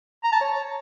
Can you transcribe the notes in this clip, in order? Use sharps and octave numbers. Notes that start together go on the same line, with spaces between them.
A#5
A5
C#5